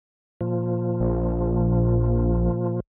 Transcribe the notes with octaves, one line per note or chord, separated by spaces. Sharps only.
A#2 F3
A#1